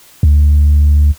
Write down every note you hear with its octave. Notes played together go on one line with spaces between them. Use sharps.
D2